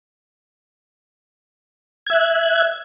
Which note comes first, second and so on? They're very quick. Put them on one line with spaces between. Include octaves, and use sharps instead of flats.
G#6 E5 F#6